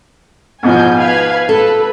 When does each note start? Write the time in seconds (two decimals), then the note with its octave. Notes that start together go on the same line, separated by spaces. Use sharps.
0.63 G#2 B2 F3 G#5 G6
0.96 B4 F5 G#6
1.49 A4 B4